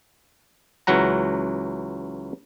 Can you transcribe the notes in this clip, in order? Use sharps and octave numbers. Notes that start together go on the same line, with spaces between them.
C#2 E3 F#3 F#5 A#5